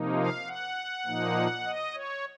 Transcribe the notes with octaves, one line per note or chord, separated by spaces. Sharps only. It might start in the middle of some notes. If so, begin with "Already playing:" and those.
Already playing: C3 F3 A#3 D#4
F5
F#5
A#2 F3 A#3 D#4
D#5
C#5